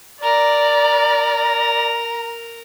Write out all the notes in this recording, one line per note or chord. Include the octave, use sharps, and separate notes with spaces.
A#4 D5 A#5